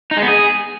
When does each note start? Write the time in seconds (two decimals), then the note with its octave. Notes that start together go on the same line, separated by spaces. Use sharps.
0.11 D#4
0.17 G#3
0.22 B3
0.28 G#4